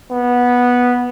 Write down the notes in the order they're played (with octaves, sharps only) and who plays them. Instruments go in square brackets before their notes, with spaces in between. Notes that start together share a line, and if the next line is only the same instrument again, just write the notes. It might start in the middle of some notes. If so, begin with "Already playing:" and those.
[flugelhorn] B3